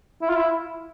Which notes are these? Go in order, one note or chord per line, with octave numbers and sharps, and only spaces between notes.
E4
F4
E4